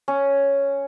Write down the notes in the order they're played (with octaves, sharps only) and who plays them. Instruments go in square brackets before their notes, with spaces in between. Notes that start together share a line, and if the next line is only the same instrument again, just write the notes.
[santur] C#4